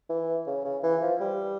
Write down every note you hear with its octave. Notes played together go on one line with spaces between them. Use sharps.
E3
C#3
C#3
E3
F3
G3